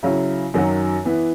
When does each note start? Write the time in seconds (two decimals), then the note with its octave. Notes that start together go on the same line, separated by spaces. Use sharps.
0.03 C#3 F#3 C#4 E4
0.54 F#2 D#3 F#3 C#4 F#4
1.05 E3 B3 E4